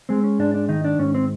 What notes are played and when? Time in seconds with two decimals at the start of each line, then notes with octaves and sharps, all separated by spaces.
0.09 G#3 C4
0.24 C#4
0.39 G#2 D4
0.54 D4
0.69 D#3 D#4
0.84 D4
0.99 G#2 C#4
1.15 C4